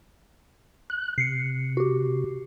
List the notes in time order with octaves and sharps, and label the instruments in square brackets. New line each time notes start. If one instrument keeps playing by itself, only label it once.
[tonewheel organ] F#6
[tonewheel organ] C3 [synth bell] C7 C#7
[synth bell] F#4 G4